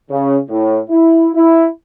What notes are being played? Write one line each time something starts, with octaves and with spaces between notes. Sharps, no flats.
C#3
A2
E4
E4